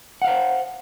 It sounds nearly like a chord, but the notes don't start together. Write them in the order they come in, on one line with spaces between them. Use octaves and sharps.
F#5 F5 C5